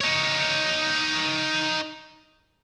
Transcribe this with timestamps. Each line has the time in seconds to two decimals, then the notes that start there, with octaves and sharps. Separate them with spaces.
0.01 D#4 C#5